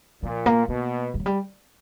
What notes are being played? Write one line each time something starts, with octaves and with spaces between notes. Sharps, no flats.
A#2 F3
A#3
B2 A#3
G#3
F#3
G3